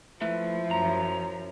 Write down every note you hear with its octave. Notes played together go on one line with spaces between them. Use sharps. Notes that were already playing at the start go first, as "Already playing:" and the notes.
F3 A3 E4 B4
F#2 A#5